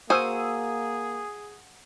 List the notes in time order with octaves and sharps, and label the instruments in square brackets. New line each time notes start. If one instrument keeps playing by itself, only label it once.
[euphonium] A#3 [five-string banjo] F#4 C5 G#5 [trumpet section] G#4 [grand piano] D#6 E6 D#7